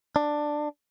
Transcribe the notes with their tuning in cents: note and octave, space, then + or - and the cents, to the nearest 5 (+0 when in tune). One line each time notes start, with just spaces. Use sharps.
D4 +10